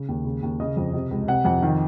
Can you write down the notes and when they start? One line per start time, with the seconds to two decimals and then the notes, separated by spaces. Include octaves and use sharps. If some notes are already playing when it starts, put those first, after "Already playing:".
Already playing: C#3
0.09 D#2
0.24 C#3
0.42 D#2
0.60 C#3 D#5
0.77 F2
0.93 C3
1.11 C#2
1.28 C3 F#5
1.45 F2 F#5
1.62 D#3